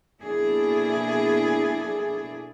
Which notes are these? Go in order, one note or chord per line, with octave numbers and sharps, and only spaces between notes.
B2 A#3 D4 E4 G#4 A4